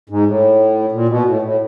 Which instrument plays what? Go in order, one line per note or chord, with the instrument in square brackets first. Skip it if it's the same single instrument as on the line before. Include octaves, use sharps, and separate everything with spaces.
[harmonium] G#2
A2
A#2
B2
A2
A2